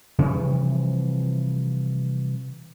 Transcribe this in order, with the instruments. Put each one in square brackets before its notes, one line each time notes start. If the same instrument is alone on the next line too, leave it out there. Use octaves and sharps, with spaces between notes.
[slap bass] C3 E3 F3 G3